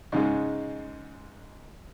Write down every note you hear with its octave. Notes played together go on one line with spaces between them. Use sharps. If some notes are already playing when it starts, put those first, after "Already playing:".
G#2 C#3 G#3